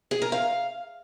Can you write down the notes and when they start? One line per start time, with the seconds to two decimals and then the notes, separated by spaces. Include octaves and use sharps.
0.11 G#4
0.22 A#4
0.32 F5